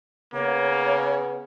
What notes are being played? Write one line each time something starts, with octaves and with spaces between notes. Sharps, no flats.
C#3 A#3 B3 C#5